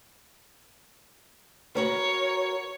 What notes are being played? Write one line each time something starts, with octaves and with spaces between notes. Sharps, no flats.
F#4 A#4 B4 C#5